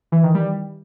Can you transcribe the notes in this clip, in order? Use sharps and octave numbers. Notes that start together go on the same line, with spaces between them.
E3
D#3
G3